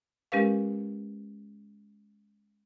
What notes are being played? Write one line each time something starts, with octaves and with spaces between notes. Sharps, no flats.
G#3 C#4 G4 A#4 B4 F5